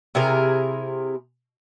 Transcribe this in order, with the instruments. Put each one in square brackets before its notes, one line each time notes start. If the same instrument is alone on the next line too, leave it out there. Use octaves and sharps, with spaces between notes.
[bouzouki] C3 E4 G#4 A#4